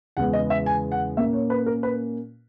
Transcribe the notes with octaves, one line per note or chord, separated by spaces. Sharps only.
E2 C#3 G#3 B3 F#5
D#5
E5
G#5
F#5
A#2 A#3 C#4 E5
C#5
B4
A#4
B4